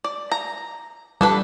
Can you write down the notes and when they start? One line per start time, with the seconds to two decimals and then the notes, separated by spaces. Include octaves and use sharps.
0.04 D5
0.32 A#5
1.21 G3 D4 A4 B4